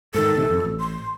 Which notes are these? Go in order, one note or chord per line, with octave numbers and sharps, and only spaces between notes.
G#2 D#3 A4
A1 C3 D#3
F2
A1
C6